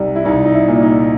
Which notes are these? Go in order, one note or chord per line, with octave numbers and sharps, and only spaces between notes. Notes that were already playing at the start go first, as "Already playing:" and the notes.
Already playing: C2 G3 D#4
E4
C2 D#4
D#4
E4
A#2
D#4